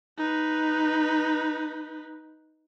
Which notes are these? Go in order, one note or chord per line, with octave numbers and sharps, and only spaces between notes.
D#4 B4